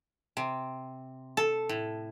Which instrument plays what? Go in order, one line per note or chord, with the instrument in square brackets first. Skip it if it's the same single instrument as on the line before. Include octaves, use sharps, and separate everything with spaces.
[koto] C3
A4
A2